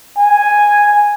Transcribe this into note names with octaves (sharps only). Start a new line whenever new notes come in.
G#5